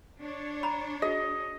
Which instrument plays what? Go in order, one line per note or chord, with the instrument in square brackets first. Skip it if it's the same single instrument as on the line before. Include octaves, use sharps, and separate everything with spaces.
[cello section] D4 C#5
[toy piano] A#5 B5
[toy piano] F#4 G#4 [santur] D#5